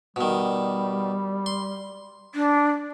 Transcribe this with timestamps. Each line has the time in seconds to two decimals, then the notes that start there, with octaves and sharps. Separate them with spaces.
0.16 B2 D#3 G3
1.46 C6
2.35 D4